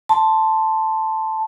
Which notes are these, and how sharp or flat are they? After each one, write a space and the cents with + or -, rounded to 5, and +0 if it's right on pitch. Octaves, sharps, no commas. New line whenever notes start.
A5 +0 C6 +0